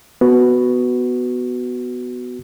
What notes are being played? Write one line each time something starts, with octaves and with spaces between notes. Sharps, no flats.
B3 F#4